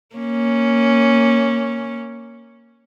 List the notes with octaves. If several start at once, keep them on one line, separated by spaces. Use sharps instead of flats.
A#3 C#4